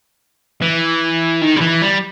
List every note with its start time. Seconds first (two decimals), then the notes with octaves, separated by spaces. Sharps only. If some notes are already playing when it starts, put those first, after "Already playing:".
0.62 E3
1.41 D#3
1.56 G3
1.61 E3
1.82 G3